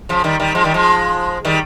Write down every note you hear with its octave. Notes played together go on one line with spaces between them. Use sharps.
C#3 F3
D#3 G3
D#3 G3
F3 G#3
D#3 G3
F3 G#3
D#3 G3